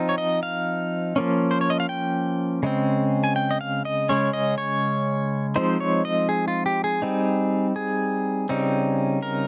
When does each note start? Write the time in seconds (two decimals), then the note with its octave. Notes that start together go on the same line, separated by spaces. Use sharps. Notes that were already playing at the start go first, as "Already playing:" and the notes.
Already playing: F3 C4 D#4
0.09 C#5
0.18 D#5
0.43 F5
1.16 F3 A#3 C#4
1.51 C5
1.61 C#5
1.70 D#5
1.80 F5
1.89 G5
2.63 C#3 G#3 C4
3.24 G#5
3.36 G5
3.51 D#5
3.61 F5
3.85 D#5
4.09 C#3 G#3 C#4 C#5
4.33 D#5
4.58 C#5
5.56 F3 G#3 C4 D#4 C5
5.80 C#5
6.05 D#5
6.29 G#4
6.48 F4
6.66 G4
6.84 G#4
7.02 G3 C4 D#4
7.76 G#4
8.49 C#3 G3 C4 D#4
9.23 A#4